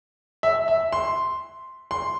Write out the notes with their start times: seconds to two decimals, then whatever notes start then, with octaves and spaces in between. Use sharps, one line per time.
0.43 E5
0.68 E5
0.92 C6
1.91 C6